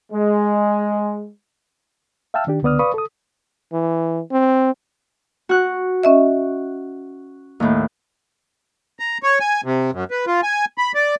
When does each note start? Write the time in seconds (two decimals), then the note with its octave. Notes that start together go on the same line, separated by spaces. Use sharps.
0.12 G#3
2.34 E5 F5 G5 A5 E6 F6
2.47 D#3 D4 G4
2.62 C#2 D3 B3 D5 D#6 F6
2.79 B4 D5 F5 B5 C#6 D#6
2.94 A4 D#6
3.73 E3
4.32 C4
5.49 F#4 F#6
6.03 C#4 D#5 E5
7.60 D#2 A2
9.00 A#5
9.23 C#5
9.40 G#5
9.64 C3
9.92 F#2
10.11 B4
10.27 F4
10.43 G#5
10.78 B5
10.94 D5